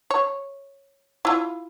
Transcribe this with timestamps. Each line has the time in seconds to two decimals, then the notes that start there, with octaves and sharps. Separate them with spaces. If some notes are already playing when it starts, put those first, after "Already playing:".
0.10 C#5
1.25 E4 F4